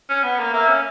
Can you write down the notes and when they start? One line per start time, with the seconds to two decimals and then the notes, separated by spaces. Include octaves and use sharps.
0.09 C#4
0.23 B3
0.39 A#3
0.53 A#3 E5
0.68 C#4